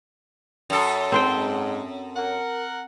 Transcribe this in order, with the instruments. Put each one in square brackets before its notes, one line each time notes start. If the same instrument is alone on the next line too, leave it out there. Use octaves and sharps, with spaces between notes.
[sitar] F#2 A4
[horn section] G#2 [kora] C4 C5 G5
[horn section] A#4 F#5